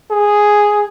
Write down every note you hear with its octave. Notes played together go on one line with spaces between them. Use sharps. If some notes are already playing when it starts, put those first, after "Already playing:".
G#4